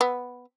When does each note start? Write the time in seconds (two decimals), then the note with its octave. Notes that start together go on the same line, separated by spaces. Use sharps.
0.01 B3